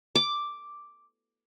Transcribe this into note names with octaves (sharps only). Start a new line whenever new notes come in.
D6